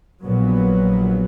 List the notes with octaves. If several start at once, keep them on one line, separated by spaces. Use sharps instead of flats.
A#1 A#2 F#3 B3